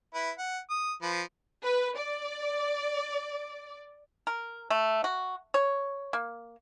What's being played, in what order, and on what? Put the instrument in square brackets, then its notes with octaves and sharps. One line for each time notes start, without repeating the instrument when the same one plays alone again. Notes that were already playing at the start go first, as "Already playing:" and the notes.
[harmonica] E4 B4
F#5
D#6
F3 B4
[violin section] B4
D5
[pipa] A#4
A3
F#4
C#5
A#3